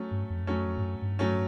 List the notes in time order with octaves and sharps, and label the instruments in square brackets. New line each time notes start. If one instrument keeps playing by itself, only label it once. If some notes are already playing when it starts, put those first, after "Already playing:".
Already playing: [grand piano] F#3 A3 C#4
[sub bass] G2
F2
F#2
[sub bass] F2 [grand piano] F#3 A3 C#4
[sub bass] F#2
F2
G2
F#2
G2
[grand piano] F#3 A3 C#4